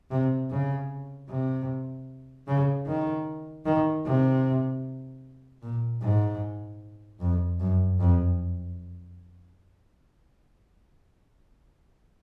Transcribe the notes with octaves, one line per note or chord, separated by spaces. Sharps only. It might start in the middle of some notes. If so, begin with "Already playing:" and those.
C3
C#3
C3
C#3
D#3
D#3
C3
A#2
G#2
F2
F#2
F2